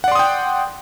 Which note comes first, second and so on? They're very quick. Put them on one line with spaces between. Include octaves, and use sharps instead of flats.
F#5 D5 C6 D#6 G5